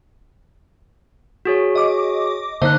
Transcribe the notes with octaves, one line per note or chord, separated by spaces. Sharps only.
F#4 G#4 C#5
D#5 D6
D3 A#3 D#4 C5 D#5 F#6